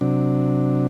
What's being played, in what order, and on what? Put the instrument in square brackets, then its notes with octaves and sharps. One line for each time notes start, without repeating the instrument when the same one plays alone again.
[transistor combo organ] C3 F#3 D4